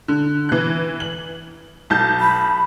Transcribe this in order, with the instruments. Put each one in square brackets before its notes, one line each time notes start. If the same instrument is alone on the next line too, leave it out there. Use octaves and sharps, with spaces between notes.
[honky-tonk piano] D3
E3 F#6
F#7
B1 A5 G6
[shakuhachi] B5